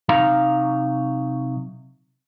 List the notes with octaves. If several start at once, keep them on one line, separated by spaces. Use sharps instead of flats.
C3 F#3 D#4 F5 A#5